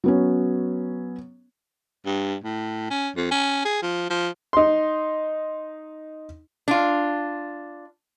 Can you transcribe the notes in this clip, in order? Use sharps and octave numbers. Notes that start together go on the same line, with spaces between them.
F#3 B3 C#4
G2
A2
C#4
F2
C#4
G#4
F3
F3
D#4 C6
D4 F4